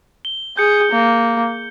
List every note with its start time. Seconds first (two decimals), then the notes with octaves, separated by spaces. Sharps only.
0.25 G7
0.57 G#4 G6 C#7
0.92 A#3